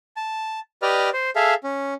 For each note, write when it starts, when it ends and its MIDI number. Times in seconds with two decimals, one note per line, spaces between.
0.17 0.60 81
0.82 1.10 67
0.82 1.10 71
0.82 1.10 74
0.82 1.10 75
0.82 1.10 89
1.13 1.30 72
1.36 1.54 68
1.36 1.54 69
1.36 1.54 76
1.36 1.54 77
1.64 1.94 61